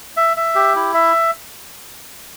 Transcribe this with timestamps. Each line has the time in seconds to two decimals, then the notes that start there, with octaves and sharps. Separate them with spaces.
0.17 E5
0.37 E5
0.55 G4
0.76 E4
0.94 E5